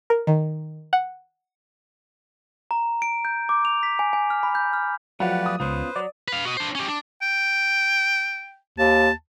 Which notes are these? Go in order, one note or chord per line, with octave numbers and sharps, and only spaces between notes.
A#4
D#3
F#5
A#5
D7
G6
D6
F7
B6
G#5
G#5
F6
B5
G6
F6
F3 F#3 A3 G4 B4 D5 F5 F#5
D#6
C#2 B3 C#4 F4 B4 C5
F#3 D5
B4 F5
F#4 D#5
D4 C5
C#4 G4
D4
G5
D#2 A5